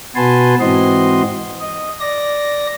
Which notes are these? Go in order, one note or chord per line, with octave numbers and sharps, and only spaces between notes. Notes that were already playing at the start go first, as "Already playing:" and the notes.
B2 F#4 B4 G#5 A5 C6
G#2 E3 C4 F#4 D#5 C6
D#5
D5 A#6